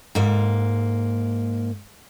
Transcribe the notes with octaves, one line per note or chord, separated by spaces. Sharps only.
G#2 A#3